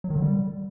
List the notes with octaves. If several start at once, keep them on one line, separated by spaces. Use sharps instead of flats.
F#3
D#3
D3
G3